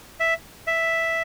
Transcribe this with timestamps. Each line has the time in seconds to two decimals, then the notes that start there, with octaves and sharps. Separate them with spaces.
0.20 E5
0.67 E5